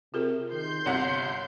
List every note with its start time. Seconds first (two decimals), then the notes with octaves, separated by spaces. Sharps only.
0.14 C3 F4 G#4 A#4
0.52 D#3 C6 G6
0.86 G1 C3 C#5 F#5